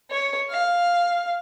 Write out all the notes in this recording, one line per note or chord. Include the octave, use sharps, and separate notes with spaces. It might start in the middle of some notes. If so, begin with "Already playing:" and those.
C#5
F5